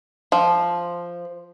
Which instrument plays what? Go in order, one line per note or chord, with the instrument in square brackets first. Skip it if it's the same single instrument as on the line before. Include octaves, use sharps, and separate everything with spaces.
[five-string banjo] F3